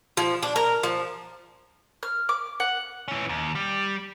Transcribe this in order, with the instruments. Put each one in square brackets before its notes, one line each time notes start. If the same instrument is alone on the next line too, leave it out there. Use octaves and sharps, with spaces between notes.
[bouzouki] F3
D4
A#4
F3
[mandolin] F6
D6
F#5
[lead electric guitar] E3 C#4
D#2
G3